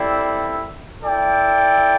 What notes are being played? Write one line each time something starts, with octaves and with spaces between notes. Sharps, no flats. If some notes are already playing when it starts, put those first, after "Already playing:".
Already playing: G3 C4 E4 A4 D5
E4 A4 D5 G5